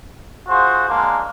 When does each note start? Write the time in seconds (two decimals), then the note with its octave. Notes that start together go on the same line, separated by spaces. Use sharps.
0.48 F4 F#4 G#4 C5
0.89 G#3 A#3 D4